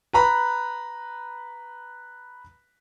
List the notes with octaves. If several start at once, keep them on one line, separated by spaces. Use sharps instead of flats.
B4 A#5 B5